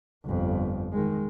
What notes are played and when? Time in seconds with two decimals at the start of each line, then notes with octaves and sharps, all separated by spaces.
0.24 G1 F2
0.92 D#3 G#3